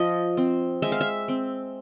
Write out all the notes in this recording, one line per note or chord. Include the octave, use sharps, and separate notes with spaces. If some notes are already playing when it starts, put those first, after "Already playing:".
Already playing: F3 D#5
C4
G#3 E5
F5
E5
C4